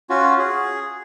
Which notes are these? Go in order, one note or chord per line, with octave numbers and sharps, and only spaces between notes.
C#4 F4 F#4
G#4